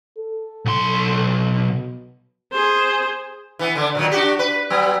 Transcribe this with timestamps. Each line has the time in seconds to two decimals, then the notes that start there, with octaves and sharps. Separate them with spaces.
0.18 A4
0.65 B1 C6
1.20 B2
2.52 G#4 C5
3.59 E3 B3
3.75 D3 D4
3.95 A#2 D#3 F#3
4.11 D4 F#4 G4
4.39 B4
4.70 F#3 B3